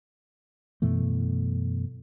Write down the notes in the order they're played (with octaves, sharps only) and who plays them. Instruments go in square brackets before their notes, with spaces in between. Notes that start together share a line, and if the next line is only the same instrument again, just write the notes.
[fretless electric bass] F#2 B2 E3 A3